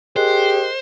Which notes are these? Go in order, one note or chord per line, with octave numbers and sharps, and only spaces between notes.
G4 G#4 A#4 C5 D#5 F#6